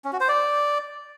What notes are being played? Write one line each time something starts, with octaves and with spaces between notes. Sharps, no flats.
C#4
F#4
C5
D5